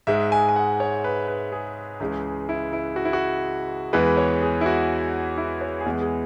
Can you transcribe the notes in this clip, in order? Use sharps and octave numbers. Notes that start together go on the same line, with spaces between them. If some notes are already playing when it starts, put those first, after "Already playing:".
G#2 G#3 E5
G#5
G#5
F#5
C#5
B4
B4
G#4
C#2 C#3 E3 G#3
E4
E4
F#4
E4
F#4
E2 E3 G#3 B4
C#5
G#4
E4
F#4
E4
C#5
G#4
E2 E3 G#3 B4
G#4